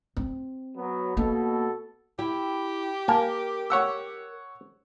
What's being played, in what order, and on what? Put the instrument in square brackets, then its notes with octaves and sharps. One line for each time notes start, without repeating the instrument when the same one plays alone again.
[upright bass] C4
[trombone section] F#3 B3
[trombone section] B2 A4 [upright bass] A#3 B3
[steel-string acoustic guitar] E4 G5 [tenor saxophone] G4
[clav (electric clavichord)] A#3 G#5 A5 [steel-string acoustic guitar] A#4
[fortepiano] C#5 F#5 E6